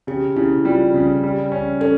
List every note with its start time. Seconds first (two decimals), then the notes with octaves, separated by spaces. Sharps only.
0.07 C#3 G4
0.36 C#3 E4
0.65 G3 F4
0.94 C#3
1.23 G3
1.52 C#4
1.81 C#4 A4